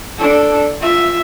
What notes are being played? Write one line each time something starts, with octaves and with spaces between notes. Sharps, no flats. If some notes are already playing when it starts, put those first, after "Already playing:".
D4 A4
F4 E5